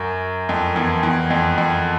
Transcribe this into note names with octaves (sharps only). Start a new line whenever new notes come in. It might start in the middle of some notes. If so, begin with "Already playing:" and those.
Already playing: F#2
F2
E2
E2
F2
F2